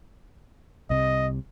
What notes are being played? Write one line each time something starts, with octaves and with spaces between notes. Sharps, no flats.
C2 C3 D#5